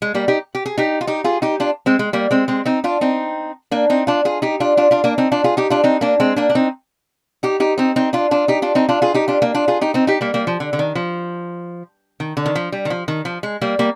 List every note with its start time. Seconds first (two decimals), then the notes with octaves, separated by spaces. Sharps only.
0.02 G#3
0.14 G3 A#3
0.28 D#4 G4
0.55 G4
0.66 G#4
0.78 D#4 G4
1.01 F4
1.07 D#4 G4
1.24 F4 G#4
1.42 D#4 G4
1.60 D4 F4
1.86 G#3 C4
1.99 G#3
2.13 G3 A#3
2.31 G#3 C4
2.48 G#3 C4
2.66 C4 D#4
2.84 D4 F4
3.01 C4 D#4
3.71 A#3 D4
3.90 C4 D#4
4.07 D4 F4
4.25 F4 G#4
4.42 D#4 G4
4.60 D4 F4
4.77 D4 F4
4.91 D4 F4
5.04 A#3 D4
5.18 C4 D#4
5.32 D4 F4
5.44 F4 G#4
5.57 D#4 G4
5.70 D4 F4
5.84 C4 D#4
6.01 A#3 D4
6.20 G#3 C4
6.36 A#3 D4
6.49 D4
6.55 C4 D#4
7.43 D#4 G4
7.60 D#4 G4
7.78 C4 D#4
7.96 C4 D#4
8.13 D4 F4
8.31 D4 F4
8.48 D#4 G4
8.62 D4 F4
8.75 C4 D#4
8.89 D4 F4
9.02 F4 G#4
9.14 D#4 G4
9.28 D4 F4
9.42 A#3 D4
9.54 D4 F4
9.68 F4 G#4
9.81 D#4 G4
9.94 C4 D#4
10.07 D#4 G4
10.21 G3 A#3
10.34 G3 A#3
10.47 F3
10.60 D3
10.73 D3
10.79 D#3
10.95 F3
12.20 D#3
12.37 D3
12.46 D#3
12.55 F3
12.72 G3
12.85 D#3
12.90 F3
13.08 D#3
13.25 F3
13.43 G#3
13.61 G3 A#3
13.79 G3 A#3